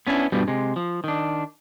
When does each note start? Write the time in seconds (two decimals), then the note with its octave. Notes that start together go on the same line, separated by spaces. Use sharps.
0.07 B3 C#4 D4 E4
0.32 G2 B2 F3 G3 B3
0.48 C3 G#3
0.76 F3
1.04 D#3 D4